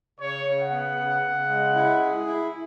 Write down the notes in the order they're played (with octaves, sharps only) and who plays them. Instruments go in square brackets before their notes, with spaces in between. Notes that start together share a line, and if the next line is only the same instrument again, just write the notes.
[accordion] C#3 [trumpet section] C#5
[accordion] C#3
[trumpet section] F#5
[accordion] B3
C#3
C#3
G#3
E4
G#4
E4